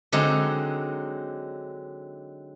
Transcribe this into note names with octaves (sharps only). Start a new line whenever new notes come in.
D3 F#3 G#3 C4 D#4